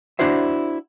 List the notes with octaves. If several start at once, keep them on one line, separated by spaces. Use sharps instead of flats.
D4 E4 F#4 C5 E5